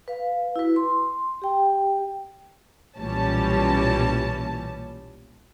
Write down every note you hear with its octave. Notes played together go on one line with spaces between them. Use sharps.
B4 F5
E4 F#4 B4
C6
G4 G5
B1 A#2 E3 G3 C#4 A5